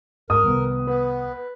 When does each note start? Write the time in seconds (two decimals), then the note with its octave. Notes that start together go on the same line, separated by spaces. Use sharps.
0.30 G#2 A#4 D#6
0.44 C2 D#3 G3 B3
0.87 B3 B4